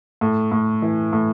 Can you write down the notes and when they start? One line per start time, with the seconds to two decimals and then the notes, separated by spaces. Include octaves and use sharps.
0.21 A2
0.52 A2
0.82 E3
1.13 A2